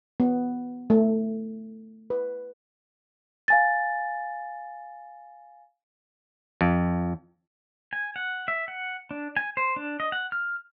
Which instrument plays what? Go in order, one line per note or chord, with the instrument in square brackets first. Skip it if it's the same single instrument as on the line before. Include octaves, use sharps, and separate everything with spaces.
[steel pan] B3
A3
B4
[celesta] F5 G#5 A6
[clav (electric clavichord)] F2
[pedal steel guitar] G#5
F#5
E5
F#5
D4
G#5
C5
D4
D#5
F#5
F6